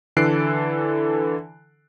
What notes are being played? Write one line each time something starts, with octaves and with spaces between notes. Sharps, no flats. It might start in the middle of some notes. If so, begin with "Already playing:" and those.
D3 E3 A4 F#6 C7 D7